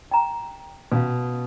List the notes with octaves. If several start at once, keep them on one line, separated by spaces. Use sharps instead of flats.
G5 A#5
B2 C#4 F5